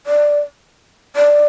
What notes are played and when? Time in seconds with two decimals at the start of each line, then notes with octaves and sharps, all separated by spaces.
0.07 D5
1.16 D5